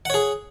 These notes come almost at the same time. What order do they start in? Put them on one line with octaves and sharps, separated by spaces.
F#5 C#5 G#4